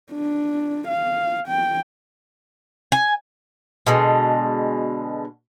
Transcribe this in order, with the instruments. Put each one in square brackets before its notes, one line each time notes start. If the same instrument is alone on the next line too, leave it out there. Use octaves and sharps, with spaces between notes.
[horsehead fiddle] D4
F5
G5
[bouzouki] G#5
B2 D3 G#3